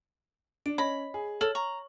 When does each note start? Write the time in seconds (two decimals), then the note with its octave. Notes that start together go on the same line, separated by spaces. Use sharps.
0.66 D4 D7
0.78 C#4 C#5 D#5 B5
1.14 G#4
1.41 A4 C#5 F6 F#7
1.55 A#5 C#6